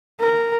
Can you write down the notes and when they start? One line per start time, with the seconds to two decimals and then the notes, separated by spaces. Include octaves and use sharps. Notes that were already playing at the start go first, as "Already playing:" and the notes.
0.20 A#4